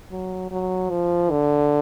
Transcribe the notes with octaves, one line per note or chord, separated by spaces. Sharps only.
F#3
F#3
F3
D3